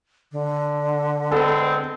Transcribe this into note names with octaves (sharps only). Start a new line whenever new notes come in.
D3
G#3 B3 C4 A4